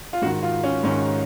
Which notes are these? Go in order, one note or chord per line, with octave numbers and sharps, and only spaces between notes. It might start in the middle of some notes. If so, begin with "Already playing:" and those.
F4
G#2 D#3 F#4
F4
C#4
G#2 D#3 C#4